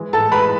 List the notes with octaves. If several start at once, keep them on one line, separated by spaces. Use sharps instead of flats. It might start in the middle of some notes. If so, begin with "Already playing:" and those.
Already playing: E3 G#3
A2 A4 A5
G#3 B4 B5